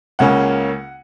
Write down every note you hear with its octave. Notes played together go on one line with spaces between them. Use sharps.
C#2 C#3 A#3 C#4 F#5